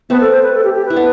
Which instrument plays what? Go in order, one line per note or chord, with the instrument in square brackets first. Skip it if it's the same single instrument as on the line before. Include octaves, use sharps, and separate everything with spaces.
[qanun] A3 C4 [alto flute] B3
[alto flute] A4
C5
B4
A4
G4
G4
[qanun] E4 [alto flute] B4
[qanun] B3 D4